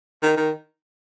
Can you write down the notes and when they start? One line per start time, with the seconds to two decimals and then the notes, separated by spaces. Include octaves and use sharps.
0.23 D#3
0.37 D#3